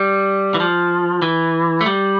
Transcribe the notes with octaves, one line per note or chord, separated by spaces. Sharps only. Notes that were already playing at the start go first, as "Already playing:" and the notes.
Already playing: G3
E3
F3
E3
A3
G3